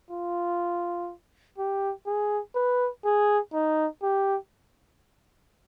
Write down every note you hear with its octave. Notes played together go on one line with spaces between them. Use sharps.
F4
G4
G#4
B4
G#4
D#4
G4